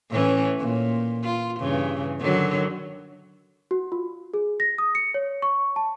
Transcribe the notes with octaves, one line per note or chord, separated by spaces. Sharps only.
A2 E3 C#4
A#2
F4
G2 C#3 E3
D3 D#3 F#3
F#4
F4
G#4
A#6
D#6
C#7
C#5
C#6
A5